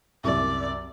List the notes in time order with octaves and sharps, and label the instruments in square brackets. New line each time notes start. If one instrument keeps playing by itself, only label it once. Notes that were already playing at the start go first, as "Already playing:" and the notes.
[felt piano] C2 F#2 [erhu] D5